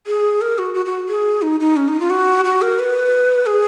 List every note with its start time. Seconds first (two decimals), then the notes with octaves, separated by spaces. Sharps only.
0.07 G#4
0.41 A#4
0.58 F#4
0.74 F#4
0.86 F#4
1.09 G#4
1.42 D#4
1.60 D#4
1.76 C#4
1.88 D#4
2.00 F4
2.10 F#4
2.45 F#4
2.62 A#4
2.79 B4
3.46 G#4